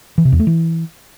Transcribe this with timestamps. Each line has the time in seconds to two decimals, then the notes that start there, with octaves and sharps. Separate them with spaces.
0.18 E3
0.25 C3
0.32 E2
0.40 A3
0.47 E3